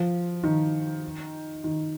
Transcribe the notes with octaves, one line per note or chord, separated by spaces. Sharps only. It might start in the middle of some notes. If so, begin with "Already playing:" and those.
Already playing: F3
D#3
D#3